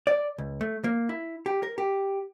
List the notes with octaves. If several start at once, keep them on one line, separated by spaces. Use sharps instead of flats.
D5
C#2
A3
A#3
E4
G4
A#4
G4